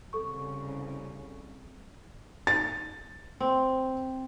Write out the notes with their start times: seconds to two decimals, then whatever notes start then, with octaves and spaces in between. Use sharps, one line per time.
0.13 C2 C#3 A4 C#6
2.47 A6
3.40 C4